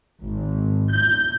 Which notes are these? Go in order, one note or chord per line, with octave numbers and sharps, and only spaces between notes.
G#1
G6